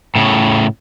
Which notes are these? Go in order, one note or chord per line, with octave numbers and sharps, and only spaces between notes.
A2 C#3